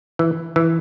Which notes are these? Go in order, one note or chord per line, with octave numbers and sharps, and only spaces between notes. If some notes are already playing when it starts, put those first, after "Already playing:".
E3
E3